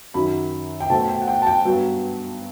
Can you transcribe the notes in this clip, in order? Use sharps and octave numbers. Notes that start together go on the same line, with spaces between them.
F#2 D#3 F#3 B5
G5
B2 F#3 A3 C4 A5
G5
F#5
G5
A5
G5
G2 F#3 B3